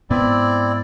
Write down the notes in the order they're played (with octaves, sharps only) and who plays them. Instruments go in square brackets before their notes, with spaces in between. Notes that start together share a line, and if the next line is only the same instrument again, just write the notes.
[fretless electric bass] G#2 B3 [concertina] C4 E4 D5